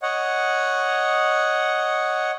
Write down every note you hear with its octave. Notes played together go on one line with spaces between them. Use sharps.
C#5 D#5 F#5